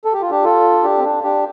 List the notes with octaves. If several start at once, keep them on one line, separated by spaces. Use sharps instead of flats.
A4
G4
F4
D4 G4
F4 A4
D4 G4
C4
D4
D4 G4